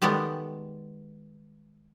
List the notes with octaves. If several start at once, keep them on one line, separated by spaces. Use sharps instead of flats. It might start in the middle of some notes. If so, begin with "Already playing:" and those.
D#3 G3 G#3 B3 A4